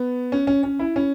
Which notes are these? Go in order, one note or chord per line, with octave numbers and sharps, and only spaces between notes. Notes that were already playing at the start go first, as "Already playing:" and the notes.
Already playing: B3
C#4
C#4
C#4
E4
C#4